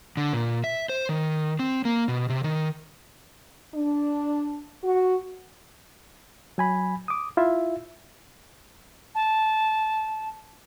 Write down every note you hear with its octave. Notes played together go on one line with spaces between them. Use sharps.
D3
A#2
E5
C5
D#3
C4
A#3
B2
C3
D#3
D4
F#4
F#3 G#5 B5
D6 D#6
E4 F4 E5
A5